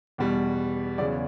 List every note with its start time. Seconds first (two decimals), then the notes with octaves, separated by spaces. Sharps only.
0.18 E2 B2 G3
0.98 E2 C#3 F#3 D5